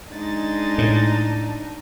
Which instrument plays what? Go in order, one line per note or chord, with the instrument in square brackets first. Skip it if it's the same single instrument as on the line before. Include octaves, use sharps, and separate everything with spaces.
[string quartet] G#3 A6 [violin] D4 D#4
[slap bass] A2